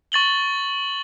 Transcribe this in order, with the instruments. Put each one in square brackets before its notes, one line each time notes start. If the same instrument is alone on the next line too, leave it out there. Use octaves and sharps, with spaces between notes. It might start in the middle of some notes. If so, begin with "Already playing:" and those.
[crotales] C#6 A6 F#7 G7